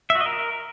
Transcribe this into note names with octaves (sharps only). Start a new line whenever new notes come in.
E5
F#4
D#5
A#4